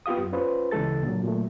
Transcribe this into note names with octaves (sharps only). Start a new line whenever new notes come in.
B3 F4 G4 F5 D#6
F#2
C#4 F4 B4 C5
D2 C#3 E3 G#3 A4 A6
A#2 D3 F#3
A#2 F#3 A3